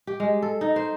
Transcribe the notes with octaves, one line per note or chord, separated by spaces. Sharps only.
G4
G#3
A4
D#4
C5